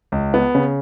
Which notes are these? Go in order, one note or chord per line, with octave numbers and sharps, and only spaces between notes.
C#2
B3
C#3